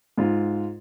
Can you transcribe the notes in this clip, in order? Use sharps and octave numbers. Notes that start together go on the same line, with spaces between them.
G#2 F4